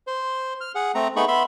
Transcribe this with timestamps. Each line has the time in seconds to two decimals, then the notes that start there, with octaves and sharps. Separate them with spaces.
0.07 C5
0.61 F6
0.75 G#4 F#5
0.95 A3 C4 A#5
1.16 A3 B3 D#4 G#4 B5 C#6
1.28 B3 E5 B5 C6